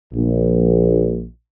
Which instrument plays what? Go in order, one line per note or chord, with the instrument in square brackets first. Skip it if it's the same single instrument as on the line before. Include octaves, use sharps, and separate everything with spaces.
[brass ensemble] A#1